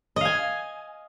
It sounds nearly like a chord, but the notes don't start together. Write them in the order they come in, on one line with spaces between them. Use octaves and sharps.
D#5 F5 G#5